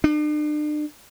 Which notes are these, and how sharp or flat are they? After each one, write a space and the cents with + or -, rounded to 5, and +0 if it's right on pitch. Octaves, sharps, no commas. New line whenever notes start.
D4 +40